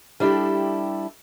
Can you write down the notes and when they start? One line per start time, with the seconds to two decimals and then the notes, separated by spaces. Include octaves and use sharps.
0.20 G3 D4 E4 G4 A4